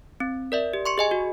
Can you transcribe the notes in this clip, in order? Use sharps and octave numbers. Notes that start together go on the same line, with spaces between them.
C4
A#4 D5 E5
G4
C6 C#6 C#7
G#4 D#5 G#5
F#4